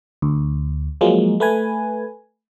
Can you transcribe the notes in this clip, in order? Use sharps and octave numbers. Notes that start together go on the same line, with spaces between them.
D2
F3 F#3 G#3 A#3
A3 B4 G#5